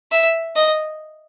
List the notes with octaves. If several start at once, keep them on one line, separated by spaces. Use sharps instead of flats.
E5
D#5